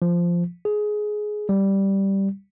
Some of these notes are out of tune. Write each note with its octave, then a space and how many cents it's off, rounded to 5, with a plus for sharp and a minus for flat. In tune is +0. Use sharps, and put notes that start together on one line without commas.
F3 -10
G#4 +15
G3 -5